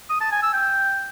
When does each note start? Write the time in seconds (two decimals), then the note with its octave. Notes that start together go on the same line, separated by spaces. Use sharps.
0.10 D#6
0.21 A5
0.31 G#5
0.42 E6
0.53 G5